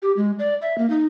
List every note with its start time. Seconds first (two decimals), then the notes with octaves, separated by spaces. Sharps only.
0.02 G4
0.17 G#3
0.39 D5
0.62 E5
0.78 A#3
0.90 D#4